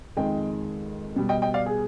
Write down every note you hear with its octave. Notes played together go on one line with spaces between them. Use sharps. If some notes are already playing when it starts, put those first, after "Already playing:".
F2 D#3 G#3 D#5 G5
B2 G3
D#5 G5
D#5 G5
D5 F5
G#4